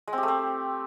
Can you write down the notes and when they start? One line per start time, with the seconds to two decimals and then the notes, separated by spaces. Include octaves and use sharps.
0.08 G#3
0.13 C4
0.18 G4
0.23 A3
0.28 C4